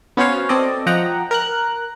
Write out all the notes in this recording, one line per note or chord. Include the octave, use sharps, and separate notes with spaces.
B3 C#4 F#4 C5 C#5 F5
C4 A4 D5 D#5
F3 D#5 F#5 G5 A#5
A#4 A#5 F#6